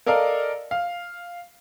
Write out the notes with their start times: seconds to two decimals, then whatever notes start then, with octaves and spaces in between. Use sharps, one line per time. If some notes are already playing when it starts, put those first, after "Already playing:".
0.06 A4 A#4 D5 D#5 F5
0.71 F5